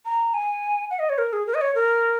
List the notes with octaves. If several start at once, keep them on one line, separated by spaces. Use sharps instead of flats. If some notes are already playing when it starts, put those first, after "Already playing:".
A#5
G#5
F#5
D#5
C#5
A#4
G#4
A#4
D#5
C#5
A#4